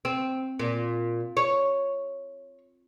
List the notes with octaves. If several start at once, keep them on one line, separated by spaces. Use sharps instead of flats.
C4
A#2
C#5